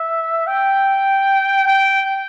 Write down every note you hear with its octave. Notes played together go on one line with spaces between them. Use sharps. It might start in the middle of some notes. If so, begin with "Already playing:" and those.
Already playing: E5
G5
G5